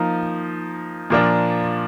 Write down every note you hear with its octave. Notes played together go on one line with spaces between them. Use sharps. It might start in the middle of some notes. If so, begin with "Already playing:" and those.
Already playing: F3 A#3 D#4
A#2 F3 A#3 D4